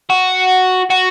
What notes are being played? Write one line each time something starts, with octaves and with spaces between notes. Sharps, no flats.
F#4
F#4